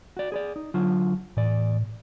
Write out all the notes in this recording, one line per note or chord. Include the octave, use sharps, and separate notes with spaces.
F#4 D5
G#4 B4 D5
D#4
D3 F#3 F4
E2 A2 D5